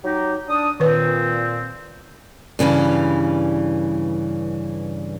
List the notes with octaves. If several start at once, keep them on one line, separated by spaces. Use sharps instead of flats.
F#3 D#4 G4
D4 D#6
A#2 D#3 C4 B4
G2 C#3 E3 G3